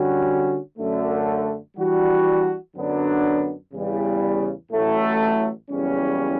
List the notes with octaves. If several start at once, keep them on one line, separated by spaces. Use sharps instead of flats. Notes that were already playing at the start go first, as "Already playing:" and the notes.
Already playing: D3 G3 C#4 F#4
F#2 D3 A3
E3 G3 D4 F#4
F#2 D3 F#3 B3 D4
E2 C#3 G3
A1 A2 F#3 A3
F#1 E2 C#3 G3 C#4